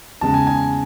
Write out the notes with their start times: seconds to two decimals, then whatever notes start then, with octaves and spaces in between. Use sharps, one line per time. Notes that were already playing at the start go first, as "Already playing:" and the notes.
0.21 E2 C#3 G#3 A5
0.34 G#5
0.47 G#5